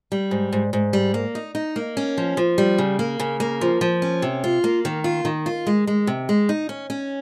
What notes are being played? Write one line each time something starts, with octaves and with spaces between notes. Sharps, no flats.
G3
G#2
G#2
G#2
G3
A#3
D#4
D#4
A#3
C#4
F3
F3
G3
C#3
A#3
C#3
A#3
F3
F3
C#4
C3
F4
A#3
D#3
F4
D#3
F4
G#3
G#3
C3
G#3
D#4
C#4
C#4